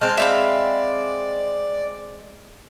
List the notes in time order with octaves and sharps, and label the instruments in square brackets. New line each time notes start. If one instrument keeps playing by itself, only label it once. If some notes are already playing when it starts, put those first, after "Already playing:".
[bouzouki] G#3 C4 [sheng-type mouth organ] A5 F6 G6
[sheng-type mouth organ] D5 [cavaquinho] E5 F5 B5